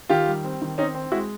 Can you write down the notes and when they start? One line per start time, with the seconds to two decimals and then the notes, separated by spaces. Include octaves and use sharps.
0.09 D#3 F4 G4
0.27 G3
0.44 C4
0.62 D#3
0.78 C4 C#4 D#4
0.95 C4
1.12 G#3 E4 F#4